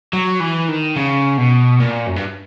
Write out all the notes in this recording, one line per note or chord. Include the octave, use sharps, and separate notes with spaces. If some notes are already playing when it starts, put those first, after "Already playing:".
F#3
E3
D#3
C#3
B2
A#2
F#2
G2